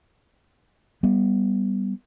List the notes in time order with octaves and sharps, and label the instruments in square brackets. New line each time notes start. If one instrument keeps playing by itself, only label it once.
[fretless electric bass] G3 B3